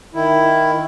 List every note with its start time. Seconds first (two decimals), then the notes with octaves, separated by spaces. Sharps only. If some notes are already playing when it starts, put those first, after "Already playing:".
0.14 D#3 E4